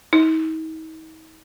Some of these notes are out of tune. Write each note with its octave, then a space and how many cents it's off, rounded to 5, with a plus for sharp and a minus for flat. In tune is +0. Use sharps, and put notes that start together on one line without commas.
D#4 +40